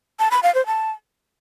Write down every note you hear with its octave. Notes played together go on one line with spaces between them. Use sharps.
A5
B5
F5
C5
A5